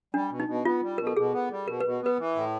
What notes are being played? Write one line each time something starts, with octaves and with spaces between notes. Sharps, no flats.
G3 D4
B2
D#4
B2
B3 F4
G3
B2 A#4
A4
B2 G#4
B3
G3
B2 A#4
B2 B4
B3 B4
E3
A2